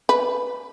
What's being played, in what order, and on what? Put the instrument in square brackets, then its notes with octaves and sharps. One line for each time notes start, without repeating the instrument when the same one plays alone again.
[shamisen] B4